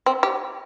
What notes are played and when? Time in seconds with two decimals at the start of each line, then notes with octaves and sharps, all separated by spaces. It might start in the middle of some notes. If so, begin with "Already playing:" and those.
0.06 C4
0.23 G4